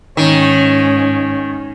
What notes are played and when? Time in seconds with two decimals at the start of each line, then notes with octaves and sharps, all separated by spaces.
0.17 G#2 D#3 C#4